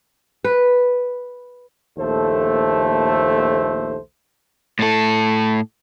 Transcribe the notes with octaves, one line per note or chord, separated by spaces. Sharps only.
B4
A#1 D#2 A3 A4 C5
A2 A4